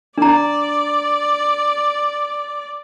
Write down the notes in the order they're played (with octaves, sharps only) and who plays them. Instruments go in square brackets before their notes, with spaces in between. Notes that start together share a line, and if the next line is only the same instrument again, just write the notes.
[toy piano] D4 A#5 [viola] D5